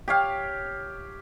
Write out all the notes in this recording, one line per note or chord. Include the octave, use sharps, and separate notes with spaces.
G4 C#5 F5